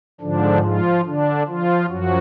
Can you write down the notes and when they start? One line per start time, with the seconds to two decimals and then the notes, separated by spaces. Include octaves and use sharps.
0.21 G#2 D3 F3 D4
0.63 F3 F4
1.05 D3 D4
1.48 F3 F4
1.90 F#2 F3 F#3 F#4